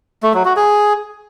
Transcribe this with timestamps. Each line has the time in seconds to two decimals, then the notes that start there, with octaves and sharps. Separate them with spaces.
0.23 A3
0.34 F#3
0.45 F#4
0.56 G#4